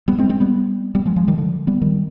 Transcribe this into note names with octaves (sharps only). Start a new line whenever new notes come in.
G3 B3
G#3 C4
G#3 C4
G3 B3
G3 B3
F3 G#3
F3 G#3
D#3 G3
D3 F3
G3 B3
D#3 G3